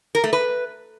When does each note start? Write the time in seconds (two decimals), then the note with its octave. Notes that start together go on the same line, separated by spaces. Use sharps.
0.15 A#4
0.24 A3
0.33 B4